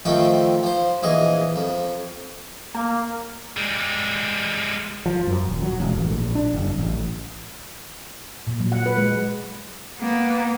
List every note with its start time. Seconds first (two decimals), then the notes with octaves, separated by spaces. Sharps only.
0.05 F2 D#3 F3 A3 C4 G5
0.63 F3 C5
1.03 A#1 E3 G#4 D#5 D#6
1.56 F2
2.75 A#3
3.57 G3 G#3
5.06 F3
5.27 F#2
5.47 D#1
5.62 F#3
5.80 E1
5.97 A1
6.10 A#1
6.35 D4
6.54 F#1
6.77 A1
8.47 A#2
8.60 F#3
8.72 F#5
8.86 B4
8.97 G#3
9.99 A#3 B3